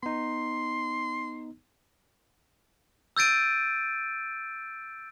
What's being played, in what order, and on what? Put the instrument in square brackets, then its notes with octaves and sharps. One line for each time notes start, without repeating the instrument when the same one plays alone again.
[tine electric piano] B3 D#4 [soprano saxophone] C6
[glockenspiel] E6 G6 A6 D7 D#7